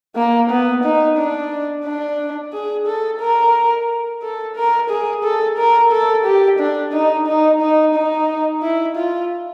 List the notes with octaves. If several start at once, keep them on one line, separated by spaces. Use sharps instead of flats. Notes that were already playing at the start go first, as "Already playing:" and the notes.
A#3
B3
D#4
D4
D4
G#4
A4
A#4
A4
A#4
G#4
A4
A#4
A4
G4
D4
D#4
D#4
D#4
D#4
E4
F4